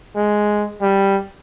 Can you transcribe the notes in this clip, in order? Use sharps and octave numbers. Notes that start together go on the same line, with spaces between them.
G#3
G3